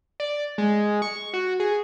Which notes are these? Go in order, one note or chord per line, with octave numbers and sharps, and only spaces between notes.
D5
G#3
C#6
F#4
G#4